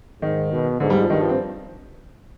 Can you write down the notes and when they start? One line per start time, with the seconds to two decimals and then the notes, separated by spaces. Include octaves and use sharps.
0.22 G#2 D#3
0.51 B2
0.80 G#2 D3
0.90 G3
1.00 F3
1.09 G2 D#3
1.20 F3
1.29 C4